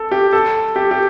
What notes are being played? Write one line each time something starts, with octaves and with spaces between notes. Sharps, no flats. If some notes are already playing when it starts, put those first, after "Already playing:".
Already playing: A4
G4
A4
G4
G4